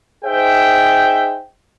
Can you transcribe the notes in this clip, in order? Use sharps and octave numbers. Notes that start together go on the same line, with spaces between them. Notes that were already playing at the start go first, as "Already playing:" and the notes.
D#4 G#4 C5 E5 G5